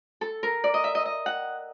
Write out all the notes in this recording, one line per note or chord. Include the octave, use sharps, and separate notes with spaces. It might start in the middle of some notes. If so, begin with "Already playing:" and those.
A4
A#4
D5
D#5
E5
D#5
D#5
F#5